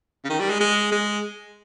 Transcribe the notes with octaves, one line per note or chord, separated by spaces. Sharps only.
C#3
D#3
G3
G#3
G#3
G#3